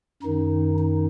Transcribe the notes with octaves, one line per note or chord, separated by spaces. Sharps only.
F#2 D#3 D#4
D#4